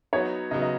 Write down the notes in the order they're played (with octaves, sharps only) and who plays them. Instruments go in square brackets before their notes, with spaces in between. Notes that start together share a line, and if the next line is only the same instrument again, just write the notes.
[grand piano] F#3 B3 D#4 [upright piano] C#5
[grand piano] C#3 F#3 B3 D#4 [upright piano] D#5
[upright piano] D#5